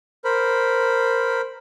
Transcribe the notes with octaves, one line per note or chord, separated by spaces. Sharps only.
A#4 C5 B5